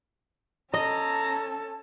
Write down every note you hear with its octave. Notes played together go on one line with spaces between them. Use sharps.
C#4 A4 D#5 A#5